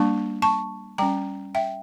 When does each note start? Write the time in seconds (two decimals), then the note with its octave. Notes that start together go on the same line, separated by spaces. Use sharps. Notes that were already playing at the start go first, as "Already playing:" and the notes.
Already playing: G3 A#3 D4 A5 C#6
0.42 A5 C#6
0.98 G3 C#4 G5 A#5
1.55 E5 G5